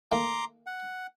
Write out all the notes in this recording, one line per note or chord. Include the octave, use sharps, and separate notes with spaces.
D#3 A3 A#3 A#5 C6 D6
F#5